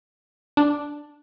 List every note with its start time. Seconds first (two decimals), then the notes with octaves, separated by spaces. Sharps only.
0.57 D4